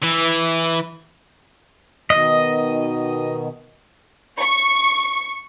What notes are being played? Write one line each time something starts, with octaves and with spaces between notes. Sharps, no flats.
E3 E4
B2 D#3 D#5
C#6